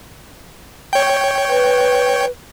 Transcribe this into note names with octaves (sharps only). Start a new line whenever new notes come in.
C#5 G5
B4